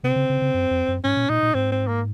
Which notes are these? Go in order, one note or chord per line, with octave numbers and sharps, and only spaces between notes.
C3 C4
C#3
C#3
C#3
F#2
F2
F#2
G#2 C#4
A#2
A#2 D#4
A#2
G#2 C4
C4
A#3